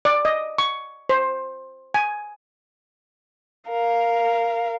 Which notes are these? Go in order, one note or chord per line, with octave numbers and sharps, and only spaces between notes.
D5
D#5
C#6
C5
G#5
A#4 F5